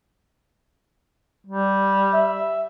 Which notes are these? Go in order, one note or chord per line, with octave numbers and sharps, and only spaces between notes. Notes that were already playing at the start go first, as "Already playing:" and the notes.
G3
E5